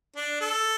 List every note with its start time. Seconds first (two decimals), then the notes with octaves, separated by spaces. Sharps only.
0.16 D4
0.41 A4